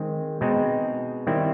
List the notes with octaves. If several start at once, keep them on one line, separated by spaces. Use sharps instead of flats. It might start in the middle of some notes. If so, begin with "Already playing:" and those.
Already playing: D#3 G#3 C4
B2 G#3 C4 D#4
D#3 G3 C4 E4